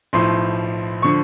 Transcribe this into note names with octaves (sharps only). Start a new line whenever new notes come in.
B1 A2 F3 C6
D3 F3 C#6